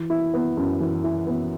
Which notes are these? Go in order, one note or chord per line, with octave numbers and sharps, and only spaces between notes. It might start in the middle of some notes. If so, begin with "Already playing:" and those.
Already playing: E3
E4
B3
F#2
E3
E4
B3